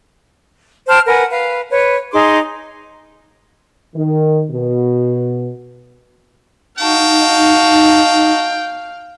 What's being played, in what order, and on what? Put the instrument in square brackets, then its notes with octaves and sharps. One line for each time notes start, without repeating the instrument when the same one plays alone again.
[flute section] C5 G5 A5 F6
A#4 B4 F#5 G#5
B4 F5
B4 C#5
D#4 G#4 C6 D6
[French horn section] D#3
B2
[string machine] D#4 [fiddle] F#4 A5 [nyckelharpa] F5 [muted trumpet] G5